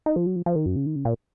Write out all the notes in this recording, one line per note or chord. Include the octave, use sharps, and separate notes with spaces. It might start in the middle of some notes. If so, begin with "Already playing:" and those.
D#4
F3
F#3
F3
F3
D#3
F#2
C#3
D#3
C#3
A#2